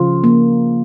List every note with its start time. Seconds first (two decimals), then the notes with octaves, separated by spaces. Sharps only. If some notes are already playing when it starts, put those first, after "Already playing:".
Already playing: C#3 F3 F4
0.24 A#3